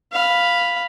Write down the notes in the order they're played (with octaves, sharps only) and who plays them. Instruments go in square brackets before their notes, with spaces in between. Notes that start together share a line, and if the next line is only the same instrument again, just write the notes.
[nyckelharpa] F5 B5